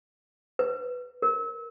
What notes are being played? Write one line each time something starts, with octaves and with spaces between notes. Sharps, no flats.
B4
A#4